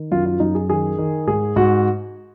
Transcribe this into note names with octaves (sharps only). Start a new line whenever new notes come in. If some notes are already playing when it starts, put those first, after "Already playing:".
Already playing: D#3
F#2 F4
F4
F#2 D#4
G#4
D#3 G#4
D#3
G#2 G#4
G#2 F#4